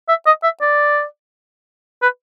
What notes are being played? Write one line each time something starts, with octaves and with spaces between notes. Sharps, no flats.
E5
D#5
E5
D5
B4